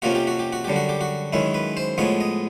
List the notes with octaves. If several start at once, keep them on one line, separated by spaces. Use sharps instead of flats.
F2 C3 F3 A#3 C#4 F#4
G4
F#4
G4
F#4
F#2 D3 G3 G4
F#4
G4
F#4
F#2 D#3 G#3 C#4 E4
B4
C5
A2 F3 G#3 B3 C#5
D#5